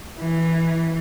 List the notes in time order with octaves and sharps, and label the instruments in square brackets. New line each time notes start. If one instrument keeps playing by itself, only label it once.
[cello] E3